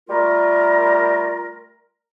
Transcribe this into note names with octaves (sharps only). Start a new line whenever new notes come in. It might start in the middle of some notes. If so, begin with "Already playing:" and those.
G3 A3 F4 A#4